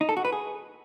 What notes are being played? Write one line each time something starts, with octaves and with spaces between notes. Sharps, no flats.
D#4
A4
F#4
B4
G#4